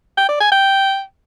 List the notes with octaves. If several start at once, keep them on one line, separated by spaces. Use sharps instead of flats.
G5
D5
G#5
G5